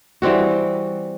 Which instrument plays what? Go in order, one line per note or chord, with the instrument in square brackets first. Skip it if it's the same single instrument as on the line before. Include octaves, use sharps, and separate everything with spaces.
[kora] E3 G3 C4 F#4